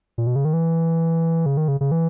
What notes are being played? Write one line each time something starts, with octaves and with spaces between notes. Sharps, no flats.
A#2
B2
C#3
D#3
E3
C#3
D#3
C#3
C#3
E3